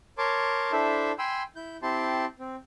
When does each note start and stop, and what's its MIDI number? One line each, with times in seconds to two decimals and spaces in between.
0.18 0.72 70
0.18 0.72 73
0.18 0.72 81
0.18 0.72 84
0.18 0.72 86
0.72 1.12 62
0.72 1.12 64
0.72 1.12 69
0.72 1.12 72
0.72 1.12 76
1.19 1.43 79
1.19 1.43 80
1.19 1.43 83
1.19 1.43 84
1.19 1.43 88
1.56 1.77 64
1.56 1.77 91
1.82 2.25 60
1.82 2.25 64
1.82 2.25 67
1.82 2.25 81
1.82 2.25 84
2.39 2.56 60